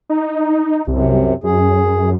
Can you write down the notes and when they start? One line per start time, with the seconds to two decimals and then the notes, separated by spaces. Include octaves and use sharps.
0.09 D#4
0.87 C2 F#2 C3
1.44 F#2 G#4